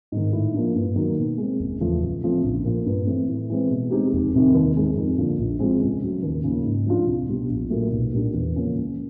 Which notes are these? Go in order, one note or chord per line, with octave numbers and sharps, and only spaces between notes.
G#2 D#3
A2
F3 A#3 D4
G2
D#3 F#3 A#3
B2
G#3 C4
F#1
E2 C#3 F3 A3
C#2
C#3 F3 A3 C4
A#1
A#2 F3
G2
E3 A3 C4
A2
E3 G#3 C4
B2
G#3 C4 D#4 G4
F1
F2 C3 D#3
D#2
D#3 G#3 C4
F2
D3 F3 A#3 D4
A#1
A2 F3 G#3 C4
C#2
C#3 F#3 A3
D#2
C#3 F3 A#3
G#2
F3 A3 D4 F4
C2
B2 G3 B3 D4
A#1
A#2 F#3 A3
B1
A#2 G3 A#3 D4
E2
C#3 F3 A#3 C#4
C#2